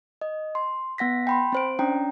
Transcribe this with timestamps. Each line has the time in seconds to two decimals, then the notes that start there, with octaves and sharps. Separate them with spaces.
0.21 D#5
0.55 C6
0.98 B3 F#5 A#6 B6
1.27 G5 B5 C6
1.52 C4 C5 D7
1.79 C#4 D4 G5 A#5